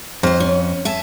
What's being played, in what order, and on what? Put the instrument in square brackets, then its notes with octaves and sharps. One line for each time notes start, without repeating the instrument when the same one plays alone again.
[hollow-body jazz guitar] F2 [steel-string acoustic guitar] C5 D#5
[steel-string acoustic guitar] C#4
E5 G#5 A5